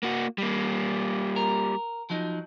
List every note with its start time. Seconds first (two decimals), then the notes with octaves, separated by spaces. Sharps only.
0.03 A#3 F#4
0.38 G3 A#3
1.36 A#4
2.10 F3 F#3 D#4